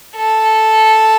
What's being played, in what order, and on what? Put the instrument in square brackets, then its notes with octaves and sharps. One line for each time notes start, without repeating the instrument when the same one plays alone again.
[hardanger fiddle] A4